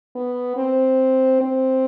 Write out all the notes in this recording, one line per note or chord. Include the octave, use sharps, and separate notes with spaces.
B3
C4
C4